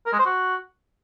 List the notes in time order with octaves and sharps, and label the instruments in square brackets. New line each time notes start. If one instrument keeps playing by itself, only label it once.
[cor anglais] A#4
G#3
C5
F#4